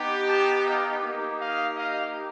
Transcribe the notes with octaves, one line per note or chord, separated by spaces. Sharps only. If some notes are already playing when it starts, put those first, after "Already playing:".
Already playing: B3 D#4 G4
G5 A5
D#5 F5
A#3 D#4 G4
D#5 F5
D#5 F5